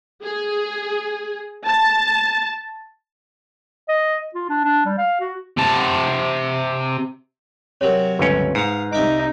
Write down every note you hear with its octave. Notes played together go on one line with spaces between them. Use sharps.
G#4
A5
D#5
F4
D4
D4
G3
F5
F#4
C3 A5
C3 F#3 A#4 C#5
G1 C#2 C#4 B4
G#2 F5 D#6
C2 D#4 E5 D6